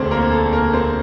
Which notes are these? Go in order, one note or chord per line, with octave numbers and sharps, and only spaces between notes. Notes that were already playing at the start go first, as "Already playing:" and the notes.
Already playing: E1 D2 D3 C4 C5
A#3 A#4
A4
A#3 A#4
C4 C5